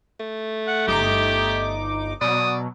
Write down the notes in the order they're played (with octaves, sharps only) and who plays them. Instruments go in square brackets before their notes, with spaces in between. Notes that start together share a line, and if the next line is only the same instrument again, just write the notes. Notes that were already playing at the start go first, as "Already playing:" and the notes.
[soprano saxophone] A3
[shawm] F#5
[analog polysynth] G1 D#4 D6 [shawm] G4
[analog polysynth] B2 F#3 [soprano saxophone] D5 [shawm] D#6